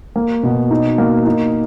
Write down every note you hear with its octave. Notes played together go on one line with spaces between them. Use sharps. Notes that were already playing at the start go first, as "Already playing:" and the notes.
A#3
B2
D#4
A#3
D#4